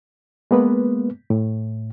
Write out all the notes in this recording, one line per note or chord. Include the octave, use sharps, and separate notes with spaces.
G#3 A#3 B3 B4
A2